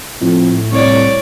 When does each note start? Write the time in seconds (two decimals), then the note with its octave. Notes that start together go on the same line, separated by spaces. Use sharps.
0.21 F2 A2
0.72 C2 C#5 D5